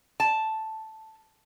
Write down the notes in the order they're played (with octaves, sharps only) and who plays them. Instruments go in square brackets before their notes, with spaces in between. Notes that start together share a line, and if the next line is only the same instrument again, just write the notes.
[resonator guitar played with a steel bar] A5